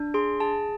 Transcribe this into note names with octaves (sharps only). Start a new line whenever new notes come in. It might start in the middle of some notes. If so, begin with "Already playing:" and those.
Already playing: D4
G#4 C6
G#4 A5